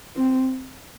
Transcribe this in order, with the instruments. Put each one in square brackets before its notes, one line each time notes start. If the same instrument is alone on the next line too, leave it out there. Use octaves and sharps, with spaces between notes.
[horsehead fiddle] C4